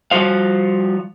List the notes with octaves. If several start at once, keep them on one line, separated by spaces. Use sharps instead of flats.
F3 G3 F#4 C5 F5